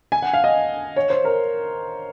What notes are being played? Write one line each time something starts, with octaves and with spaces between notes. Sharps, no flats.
G#5
F#5
F5
D#5
C#5
C5
A#4